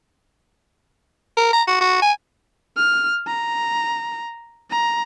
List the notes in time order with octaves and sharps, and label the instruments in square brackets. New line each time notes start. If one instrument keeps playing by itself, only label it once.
[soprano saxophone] A#4
A#5
F#4
F#4
G#5
[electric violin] F6
A#5
A#5